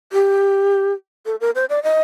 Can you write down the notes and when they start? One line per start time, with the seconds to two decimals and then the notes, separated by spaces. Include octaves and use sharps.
0.13 G4
1.26 A4
1.41 A#4
1.55 C5
1.69 D5
1.83 D#5